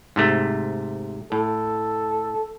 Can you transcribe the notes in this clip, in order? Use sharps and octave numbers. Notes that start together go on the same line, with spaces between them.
G#2 C3 A3
A2 A4